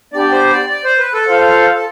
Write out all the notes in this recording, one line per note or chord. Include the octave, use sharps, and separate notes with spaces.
B3 D4 G4 D5
C5
D5
D5
C5
B4
A4
F4 C5 F5
A4